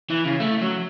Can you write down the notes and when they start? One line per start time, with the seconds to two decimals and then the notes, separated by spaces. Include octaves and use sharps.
0.10 E3
0.25 C#3
0.40 A3
0.61 F#3